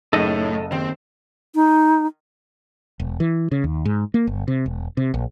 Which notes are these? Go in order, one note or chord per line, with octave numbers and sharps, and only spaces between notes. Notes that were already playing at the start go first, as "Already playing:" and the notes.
F#1 A2 D#4 A4 D#5
D#2 C4
D#4
E1
E3
C#3
D#2
G#2
A#3
G1
C3
E1
C3
A#1